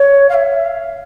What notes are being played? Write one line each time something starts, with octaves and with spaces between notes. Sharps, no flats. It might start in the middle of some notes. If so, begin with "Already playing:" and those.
Already playing: C#5
F5
E5
F5